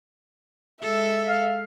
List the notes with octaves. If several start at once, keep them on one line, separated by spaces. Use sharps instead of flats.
G#3 A4 E5
F5